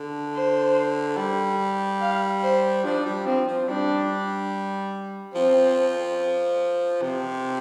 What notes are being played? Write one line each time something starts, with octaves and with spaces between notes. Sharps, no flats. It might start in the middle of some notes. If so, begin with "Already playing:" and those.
Already playing: D3
C5
G3
F5
C5
F3 D4
G3
F3 C4
F3
G3 D4
F3 C4
C3